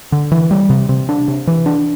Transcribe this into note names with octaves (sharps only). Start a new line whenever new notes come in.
D3
E3
G3
C3
C3
D4
C3
E3
D4